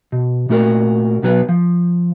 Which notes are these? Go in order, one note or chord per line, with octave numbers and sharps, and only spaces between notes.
B2
A#2 A3 F#4 A#4
B1 B2 F#3 B4
F3